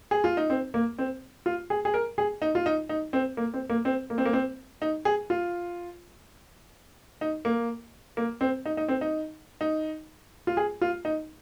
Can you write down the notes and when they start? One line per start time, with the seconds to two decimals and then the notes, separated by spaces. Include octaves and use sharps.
0.11 G#4
0.24 F4
0.37 D#4
0.50 C4
0.74 A#3
0.98 C4
1.46 F4
1.70 G#4
1.85 G#4
1.94 A#4
2.18 G#4
2.42 D#4
2.55 F4
2.66 D#4
2.89 D#4
3.13 C4
3.37 A#3
3.54 C4
3.70 A#3
3.85 C4
4.10 A#3
4.18 C4
4.25 A#3
4.33 C4
4.82 D#4
5.05 G#4
5.30 F4
7.21 D#4
7.45 A#3
8.17 A#3
8.41 C4
8.66 D#4
8.77 D#4
8.88 C4
9.01 D#4
9.61 D#4
10.47 F4
10.57 G#4
10.81 F4
11.05 D#4